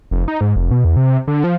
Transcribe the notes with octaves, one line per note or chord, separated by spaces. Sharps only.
F1
D#4
G#2
F1
B2
E2
C3
D3
F3